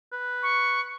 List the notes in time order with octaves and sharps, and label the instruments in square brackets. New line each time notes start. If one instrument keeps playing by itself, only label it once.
[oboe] B4
[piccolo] C#6